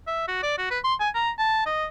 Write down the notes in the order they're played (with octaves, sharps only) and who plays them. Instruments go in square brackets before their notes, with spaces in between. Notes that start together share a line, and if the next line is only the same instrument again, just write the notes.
[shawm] E5
F#4
D5
F#4
B4
C6
G#5
A#5
A5
D#5